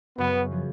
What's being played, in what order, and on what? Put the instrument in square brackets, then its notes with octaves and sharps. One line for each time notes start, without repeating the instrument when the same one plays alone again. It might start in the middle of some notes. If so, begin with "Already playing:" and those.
[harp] F#2 C#3 F#3 C#4 [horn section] B3
[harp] F3 B3 F4 G#4